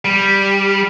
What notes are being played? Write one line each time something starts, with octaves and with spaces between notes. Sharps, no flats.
G3